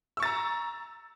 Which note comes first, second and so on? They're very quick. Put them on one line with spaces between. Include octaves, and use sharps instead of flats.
E6 C#6 A6 A#5